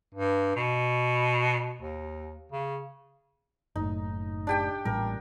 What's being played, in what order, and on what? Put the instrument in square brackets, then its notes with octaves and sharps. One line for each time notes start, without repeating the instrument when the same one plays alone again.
[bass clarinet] G2
B2
D#2
C#3
[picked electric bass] F#1 A2 [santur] D#4
[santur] D4 G4 G5
[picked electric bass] A1 A#2 G3 [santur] A#4